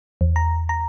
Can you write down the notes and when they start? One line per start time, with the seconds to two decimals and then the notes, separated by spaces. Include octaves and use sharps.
0.21 E2
0.36 A#5
0.69 A#5